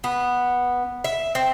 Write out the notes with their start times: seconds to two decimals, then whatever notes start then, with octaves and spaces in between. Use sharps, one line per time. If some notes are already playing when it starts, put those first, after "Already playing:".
0.04 B3
1.04 E5
1.35 C4